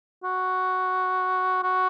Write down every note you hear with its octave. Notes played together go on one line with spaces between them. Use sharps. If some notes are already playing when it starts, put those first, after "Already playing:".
F#4
F#4